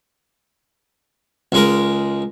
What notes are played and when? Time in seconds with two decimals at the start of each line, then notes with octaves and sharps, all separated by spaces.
1.52 C#2 G#3 A#4